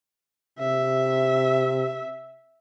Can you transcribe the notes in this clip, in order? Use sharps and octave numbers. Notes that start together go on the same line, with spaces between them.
C3 E5